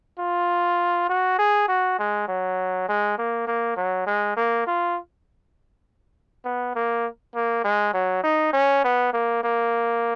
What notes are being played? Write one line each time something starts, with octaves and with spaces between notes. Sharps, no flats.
F4
F#4
G#4
F#4
G#3
F#3
G#3
A#3
A#3
F#3
G#3
A#3
F4
B3
A#3
A#3
G#3
F#3
D#4
C#4
B3
A#3
A#3